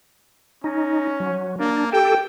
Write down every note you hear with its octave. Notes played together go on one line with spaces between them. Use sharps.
C#4 D#4
F#3
A#3 D4
G4 A4 G5